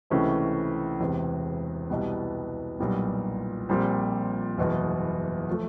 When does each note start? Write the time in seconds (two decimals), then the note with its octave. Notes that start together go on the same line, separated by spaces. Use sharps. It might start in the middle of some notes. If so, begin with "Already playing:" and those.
0.10 C#2 C3 E3 A3 C#4
1.00 E1 E2 C3
1.90 C2 B2 G3 B3
2.79 B1 A#2 G3 B3
3.69 A#1 A#2 G3 C4
4.58 F#1 E2 B2
5.50 F3 A3